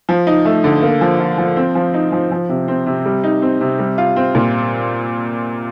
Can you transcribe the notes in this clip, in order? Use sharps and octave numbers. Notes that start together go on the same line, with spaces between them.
F3
D#4
A3
D3
A#3
F3
F4
F3
C4
F3
D#4
F3
F3
C3
C4
C3
G3
D#4
C4
C3
G3
F4
C4
A#2